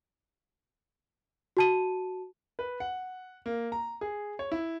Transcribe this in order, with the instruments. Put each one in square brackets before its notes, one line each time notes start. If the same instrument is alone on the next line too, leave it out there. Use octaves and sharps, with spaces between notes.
[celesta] F#4 A5 D#7
[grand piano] B4
F#5
A#3
A#5
G#4
C#5
E4